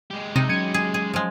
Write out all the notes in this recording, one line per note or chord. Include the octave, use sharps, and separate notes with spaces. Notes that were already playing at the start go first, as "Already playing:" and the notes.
G#3 G4
C3 D#4
F#3 C#4 G#6 C#7 D#7
G#4
G#4
F3 G#3